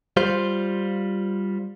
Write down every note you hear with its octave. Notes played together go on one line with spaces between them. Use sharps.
G3 F4 C5